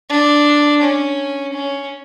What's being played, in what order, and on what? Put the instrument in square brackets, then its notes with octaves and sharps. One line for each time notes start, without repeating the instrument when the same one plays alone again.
[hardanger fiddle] D4
C#4
C#4